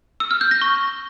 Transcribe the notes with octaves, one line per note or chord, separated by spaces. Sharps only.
E6
F6
G6
A#6
C#6